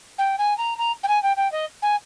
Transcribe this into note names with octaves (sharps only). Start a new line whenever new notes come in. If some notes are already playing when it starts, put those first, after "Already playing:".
G5
G#5
A#5
A#5
G5
G#5
G5
G5
D#5
G#5